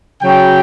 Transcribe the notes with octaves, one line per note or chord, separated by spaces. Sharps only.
C#3 F#3 G5